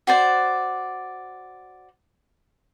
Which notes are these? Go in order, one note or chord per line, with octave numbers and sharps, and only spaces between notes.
F#4 C5 D5